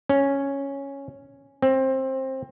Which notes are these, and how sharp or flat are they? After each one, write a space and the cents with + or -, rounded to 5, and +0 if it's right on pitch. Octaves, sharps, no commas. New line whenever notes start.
C#4 +0
C4 +20